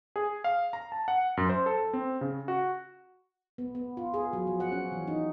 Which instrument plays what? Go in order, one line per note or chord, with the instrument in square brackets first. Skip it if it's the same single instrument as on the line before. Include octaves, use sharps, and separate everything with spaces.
[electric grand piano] G#4
F5
A#5
A5
F#5
F#2
C5
A4
C4
C#3
F#4
[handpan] B3
B3
F4
G#4
F#3
F3
F#5
C#4
E3
D#4